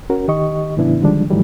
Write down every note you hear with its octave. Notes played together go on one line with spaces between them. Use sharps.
C#4 F#4 A#4
D#3 G4 D#5 C#6
A2 C#3 E3 B3 D4 E4
D3 D#3 F3 G3 G#3 D4
G#2 D#3 E3 F#3 G3 A3